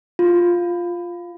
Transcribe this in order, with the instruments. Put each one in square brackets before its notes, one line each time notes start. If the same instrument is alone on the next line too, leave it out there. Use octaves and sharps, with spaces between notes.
[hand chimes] F4